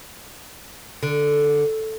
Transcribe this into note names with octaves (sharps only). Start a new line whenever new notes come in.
D3